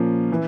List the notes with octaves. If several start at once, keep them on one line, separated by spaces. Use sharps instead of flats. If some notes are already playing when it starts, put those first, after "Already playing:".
Already playing: A#2 F3 A#3 C#4
E3